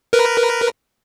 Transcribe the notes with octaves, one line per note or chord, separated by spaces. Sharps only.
A#4 B4